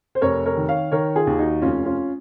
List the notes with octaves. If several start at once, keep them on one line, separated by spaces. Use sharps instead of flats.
C5
F1 A#4 C#5
A#4 C#5
D#3
C#5 F5
D#3 A#4 C#5
F4 G#4
D#2
D#4 F#4
F1 C#4 F4
C#4 F4